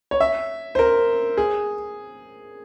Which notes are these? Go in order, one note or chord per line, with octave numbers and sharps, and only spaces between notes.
C#5
E5
C5
A#4
G#4